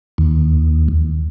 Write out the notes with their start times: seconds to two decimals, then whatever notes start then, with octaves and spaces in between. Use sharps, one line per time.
0.18 D#2